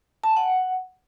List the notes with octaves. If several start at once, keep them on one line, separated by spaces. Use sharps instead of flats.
A5
G#5
F#5